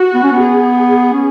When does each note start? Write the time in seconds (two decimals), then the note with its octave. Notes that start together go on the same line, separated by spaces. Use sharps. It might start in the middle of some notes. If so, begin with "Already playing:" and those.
Already playing: F#4
0.14 B3
0.23 C#4
0.32 B3
0.40 G#4
1.14 C#4